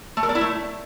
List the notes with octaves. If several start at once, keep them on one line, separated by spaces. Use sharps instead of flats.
A3
A#4
D5
E4
A3